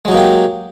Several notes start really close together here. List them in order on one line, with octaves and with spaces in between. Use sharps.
G#3 F#3 D#4 A#3 G4